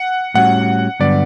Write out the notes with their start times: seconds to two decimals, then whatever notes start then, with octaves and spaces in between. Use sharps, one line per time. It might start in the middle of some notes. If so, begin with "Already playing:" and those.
Already playing: F#5
0.34 A2 G3 C#4 F#4 F#5
1.00 G2 D3 F#3 B3 F#4 D5